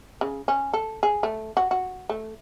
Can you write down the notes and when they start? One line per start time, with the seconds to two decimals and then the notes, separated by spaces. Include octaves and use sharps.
0.21 C#3
0.48 C#4
0.73 A4
1.03 G#4
1.23 A3
1.57 F#4
1.71 F#4
2.09 A3